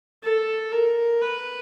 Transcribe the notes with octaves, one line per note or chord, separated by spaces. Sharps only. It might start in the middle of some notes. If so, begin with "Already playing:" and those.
A4
A#4
B4